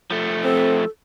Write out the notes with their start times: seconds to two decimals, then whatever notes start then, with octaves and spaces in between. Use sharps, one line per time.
0.11 F3 A3
0.44 C4 A4